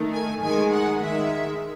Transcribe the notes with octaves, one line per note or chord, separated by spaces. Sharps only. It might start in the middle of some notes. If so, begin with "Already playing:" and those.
Already playing: D#3 A3
G#5
D#3 G#3 G#5
F#5
D#3 G#3 E5